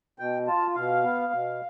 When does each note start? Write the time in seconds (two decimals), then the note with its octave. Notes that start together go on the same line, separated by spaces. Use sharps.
0.19 B2 G5
0.47 F4 A5
0.75 B2 F5
1.04 B3
1.33 B2